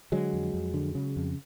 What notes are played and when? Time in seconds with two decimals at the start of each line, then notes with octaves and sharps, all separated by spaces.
0.12 D3 F#3 G#3
0.33 F2
0.54 F2
0.74 D3
0.95 C#3
1.16 F2